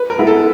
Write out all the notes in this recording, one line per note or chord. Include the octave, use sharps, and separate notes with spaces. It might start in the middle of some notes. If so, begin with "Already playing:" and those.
Already playing: B4
A#4
G#3 B3 E4 G#4
A4